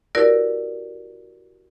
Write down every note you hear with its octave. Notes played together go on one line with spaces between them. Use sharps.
E4 F#4 G4 A#4 B4 D5